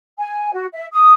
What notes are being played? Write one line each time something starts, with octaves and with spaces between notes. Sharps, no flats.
G#5
F#4
E5
D#6